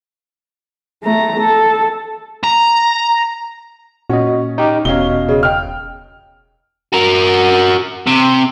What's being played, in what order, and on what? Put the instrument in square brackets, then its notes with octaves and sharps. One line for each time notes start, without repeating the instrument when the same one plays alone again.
[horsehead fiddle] A3 A#5
A4
[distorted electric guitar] A#5
[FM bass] A#2 [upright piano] C#4 [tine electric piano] F#4 D#5
[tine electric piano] D#4 G4
[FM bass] E1 [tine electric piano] B2 D#5 F5 [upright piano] C#4 G7
[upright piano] C#3
G5 F6
[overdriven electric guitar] F#4 A#4
C3